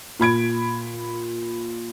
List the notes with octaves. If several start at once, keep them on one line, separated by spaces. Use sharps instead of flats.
A#2 B5 G#6 D7